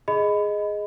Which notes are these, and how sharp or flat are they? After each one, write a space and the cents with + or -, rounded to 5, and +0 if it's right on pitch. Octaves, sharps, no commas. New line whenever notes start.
G#4 +0 D#5 +0 B5 +20